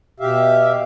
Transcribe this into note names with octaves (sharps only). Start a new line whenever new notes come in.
B2 G4 E5 F5